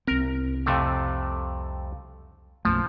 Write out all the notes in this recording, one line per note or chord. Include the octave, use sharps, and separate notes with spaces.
C2 C4 A#4
F2 C3 A3
B1 F#2 F3 A3